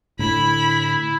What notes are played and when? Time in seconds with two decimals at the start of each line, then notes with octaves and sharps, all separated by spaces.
0.19 A2 D3 E4 B5